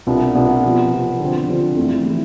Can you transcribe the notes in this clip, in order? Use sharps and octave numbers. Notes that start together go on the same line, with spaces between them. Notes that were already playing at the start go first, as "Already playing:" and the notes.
C2 B2 B3 D4 F4
C2 B2 B3 D4 F4
C3 F3 B3
C3 F3 B3
D3 F3 C4
D3 F3 C4
F2 E3 A3 E4
E3 A3 E4